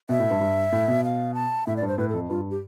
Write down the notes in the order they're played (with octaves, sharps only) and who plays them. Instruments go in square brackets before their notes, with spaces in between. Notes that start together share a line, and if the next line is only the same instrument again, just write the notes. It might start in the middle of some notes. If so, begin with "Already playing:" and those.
[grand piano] B2 [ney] E5
[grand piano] A2
G2
G2
A2
B2
[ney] F5
A5
[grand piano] A2 [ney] E5
[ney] D5
[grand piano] G2
[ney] C5
[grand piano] A2 [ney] B4
[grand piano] F2 [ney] A4
[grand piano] G2 [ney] F4
[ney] G4